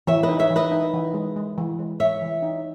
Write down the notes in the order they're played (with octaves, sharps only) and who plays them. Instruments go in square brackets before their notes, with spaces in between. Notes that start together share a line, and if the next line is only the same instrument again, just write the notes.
[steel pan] E3 [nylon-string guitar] C#5 E5
[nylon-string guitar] B4 D#5
[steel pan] D#4
[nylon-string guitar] C#5 E5
[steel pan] E3
[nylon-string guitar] B4 D#5
[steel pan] D#4
E3
G#3
G#3
E3
G#3
[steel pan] G#3 [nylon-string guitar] C#5 E5
[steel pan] E3
D#4